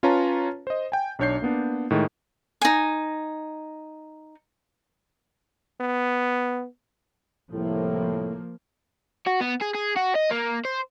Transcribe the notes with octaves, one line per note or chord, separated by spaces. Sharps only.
C#4 F4 B4 C#5 A5 A#5
C5 D#5
G5 G#5
B1 D4 C#5 G6 C7
A#3 B3 D4
A2 D#3 G#3
D#4 G#5
B3
C2 A2 F3 A#3
F#4
B3
G#4
G#4
F#4
D#5
A#3
C5